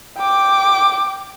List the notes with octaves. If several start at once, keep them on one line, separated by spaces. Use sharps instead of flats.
G5 D6